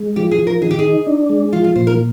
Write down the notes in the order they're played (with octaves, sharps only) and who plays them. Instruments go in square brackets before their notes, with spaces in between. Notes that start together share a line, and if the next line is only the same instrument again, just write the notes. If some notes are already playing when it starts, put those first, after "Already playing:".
Already playing: [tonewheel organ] G#3
[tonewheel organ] F3 [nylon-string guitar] G4
[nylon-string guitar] G#4
[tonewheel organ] F3
[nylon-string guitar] A#4
[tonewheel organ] D#3 [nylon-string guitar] G#4
[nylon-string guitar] G4
G#4
[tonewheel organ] D#4
D4
G#3
[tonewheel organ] F3 [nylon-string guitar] F4
[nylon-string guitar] F4
[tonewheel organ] A#2 [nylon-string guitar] C5
[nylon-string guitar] A#4